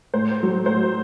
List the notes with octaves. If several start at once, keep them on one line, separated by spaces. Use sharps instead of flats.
A2 C5
F#3 A3
A2 C5